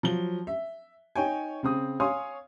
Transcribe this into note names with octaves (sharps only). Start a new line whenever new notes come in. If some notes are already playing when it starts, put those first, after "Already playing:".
F3 F#3 G7
E5
D#4 C#5 G5 G#5
C#3 C4 D#6
C#5 F5 G#5 C6 D#6